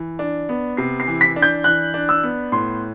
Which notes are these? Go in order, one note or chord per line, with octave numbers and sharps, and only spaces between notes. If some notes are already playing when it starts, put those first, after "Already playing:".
Already playing: E3
D4
B3
C3 C7
C7
E3
B6
D4
G6
E3 F#6
D4
E6
B3
A2 C6